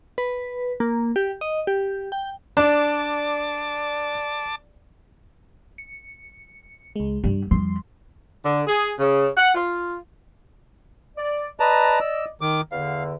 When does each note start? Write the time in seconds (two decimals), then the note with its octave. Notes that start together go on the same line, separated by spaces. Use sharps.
0.18 B4
0.80 A#3
1.16 G4
1.41 D#5
1.67 G4
2.12 G5
2.57 D4 D5 A5 D6
5.78 C#7
6.96 C#2 G#3
7.24 G2 G3
7.51 F2 G3 C6
8.44 D3
8.67 G#4
8.99 C#3
9.37 F#5
9.55 F4
11.17 D5
11.60 B4 D5 D#5 A5 A#5
12.00 E6
12.41 D#3 D6
12.72 E2 D3 F5